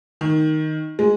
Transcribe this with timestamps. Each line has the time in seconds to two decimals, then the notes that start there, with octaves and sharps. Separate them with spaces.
0.21 D#3
0.99 G#3